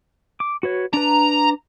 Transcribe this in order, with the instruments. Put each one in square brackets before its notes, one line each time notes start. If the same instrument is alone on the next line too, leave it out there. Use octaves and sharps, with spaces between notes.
[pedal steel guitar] D6
F#4 B4 C#5
[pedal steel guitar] D4 B4 [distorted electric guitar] A#5